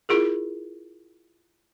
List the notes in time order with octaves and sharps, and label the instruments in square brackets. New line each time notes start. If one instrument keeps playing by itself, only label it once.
[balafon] E4 F4 G#4 A#4